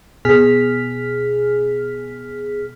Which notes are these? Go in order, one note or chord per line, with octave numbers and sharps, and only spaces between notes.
B2 G#4 F6 B6